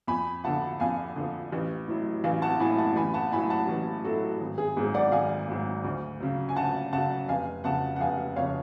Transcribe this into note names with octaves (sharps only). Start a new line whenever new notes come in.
F2 G#5 B5
D3 F3 F#5 A5
F2 F5 G#5
D3 F3
A1
A2 F#3
A1 F5 G#5
F#5 A5
A2 F#3 G#5 B5
F#5 A5
A1 G#5 B5
F#5 A5
A2 F#3 G#5 B5
F#5 A5
A1
A2 F#3 F#4 A4
G#1
G#4
G#2 F#3 G#4
D5 F#5
G#1 F5 G#5
G#2 F#3
D2
C#3 F#3
G#5
D2 F#5 A5
C#3 F#3 F#5 A5
F1 F5 G#5
F2 C#3 F#5 A5
F#5
F1 F5 G#5
F2 C#3 C#5 F5